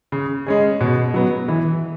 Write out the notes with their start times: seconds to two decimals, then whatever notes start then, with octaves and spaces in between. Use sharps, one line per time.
0.12 C#3
0.46 G#3 C#4 G#4
0.81 B2
1.14 F#3 B3
1.48 E3